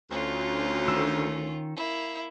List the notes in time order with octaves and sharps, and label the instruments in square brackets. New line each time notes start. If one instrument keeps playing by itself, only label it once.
[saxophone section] D2 [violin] C#4 F4
[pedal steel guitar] D#3 E6
[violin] A#3 E4